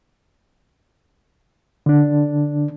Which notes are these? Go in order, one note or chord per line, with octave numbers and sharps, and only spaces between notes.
D3 D4